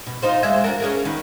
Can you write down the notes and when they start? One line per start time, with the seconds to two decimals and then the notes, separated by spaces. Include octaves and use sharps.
0.06 B2
0.22 D#4 F4 C5
0.43 G#3 D5 E5
0.64 D4 F#4 A#4
0.80 C#4 G#4 A#4
1.05 D#3 B3